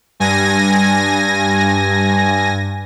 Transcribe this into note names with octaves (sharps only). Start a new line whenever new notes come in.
G2 G#5 A#6